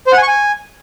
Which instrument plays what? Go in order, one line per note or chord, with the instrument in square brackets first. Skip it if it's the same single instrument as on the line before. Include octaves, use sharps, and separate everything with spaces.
[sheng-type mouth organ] C5
F#5
G#5
C#6
G#5